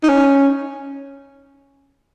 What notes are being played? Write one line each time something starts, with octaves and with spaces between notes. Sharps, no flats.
D#4
C#4